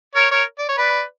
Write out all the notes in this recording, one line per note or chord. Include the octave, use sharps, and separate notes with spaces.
A#4 C#5
A#4 C#5
D5
C#5
B4 D5